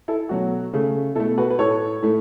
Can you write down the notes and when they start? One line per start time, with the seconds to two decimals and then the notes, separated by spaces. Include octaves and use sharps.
0.08 E4 A4
0.29 B2 F#3 A3 F#4
0.73 C#3 A3
1.15 B2 A3 E4 A4
1.38 F#4 B4
1.50 B4
1.59 A2 A3 A4 C#5
2.02 A2 A3